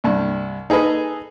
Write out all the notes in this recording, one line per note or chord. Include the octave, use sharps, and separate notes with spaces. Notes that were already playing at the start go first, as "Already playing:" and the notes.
C2 G2
D#4 G#4 A4 B4 D#5